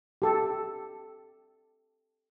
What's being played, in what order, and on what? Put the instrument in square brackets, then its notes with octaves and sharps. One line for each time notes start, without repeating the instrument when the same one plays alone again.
[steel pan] G4 A4